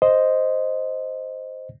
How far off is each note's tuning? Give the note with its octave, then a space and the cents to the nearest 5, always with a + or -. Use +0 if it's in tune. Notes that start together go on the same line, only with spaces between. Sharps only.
C5 +0 D#5 +0